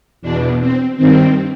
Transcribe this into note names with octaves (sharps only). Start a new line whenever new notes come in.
E2 B2 D4
C4
G2 D#3 C4